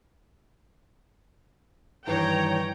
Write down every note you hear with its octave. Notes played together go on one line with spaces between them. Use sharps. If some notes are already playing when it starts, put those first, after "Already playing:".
G2 D#3 E3 C#5 G5 A#5